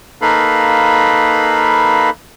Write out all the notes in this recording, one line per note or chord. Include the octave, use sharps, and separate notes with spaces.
A#3 D#4 A4 B4 F5 B5